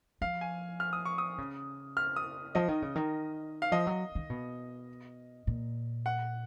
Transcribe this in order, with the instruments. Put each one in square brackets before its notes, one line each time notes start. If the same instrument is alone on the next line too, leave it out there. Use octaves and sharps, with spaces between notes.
[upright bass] F3 [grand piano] F5
[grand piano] G#5
F6
D#6
C#6
D#6
[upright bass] C#3
[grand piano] F6
D#6
[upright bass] F3 [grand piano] D#5
[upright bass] D#3
C#3
D#3
[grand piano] F5
[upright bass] F3 [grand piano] D#5
[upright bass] F#3
D#3
B2
A#2
[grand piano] F#5